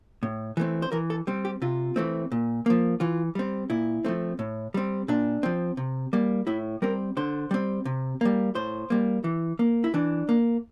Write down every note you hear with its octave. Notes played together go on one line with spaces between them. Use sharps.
A2
E3 A3 C4
C5
E3 A#4
A4
G3 C4
G4
C3 F4
E3 A3 C4
A#2
F3 A#3
E3 F4
G3 C4
A#2 E4
F3 A3 C4
A2
G3 C4
A#2 D4
F3 C4
C3
G3 A#3
A2 E4
G3 C4 A#4
D3 C5
G3 C4
C3
G3 A#3
A2 C5
G3 A#3
E3
A#3
E4
E3 D4
A#3